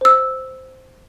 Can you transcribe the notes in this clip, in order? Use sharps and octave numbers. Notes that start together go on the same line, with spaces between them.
C5 E6